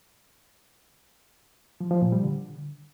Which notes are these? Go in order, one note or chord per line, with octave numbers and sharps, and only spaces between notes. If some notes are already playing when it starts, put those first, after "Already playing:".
F3
F3
A#2
G3
D3